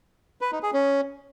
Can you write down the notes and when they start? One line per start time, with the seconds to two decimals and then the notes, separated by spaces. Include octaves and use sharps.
0.41 B4
0.52 D#4
0.63 G#4
0.73 C#4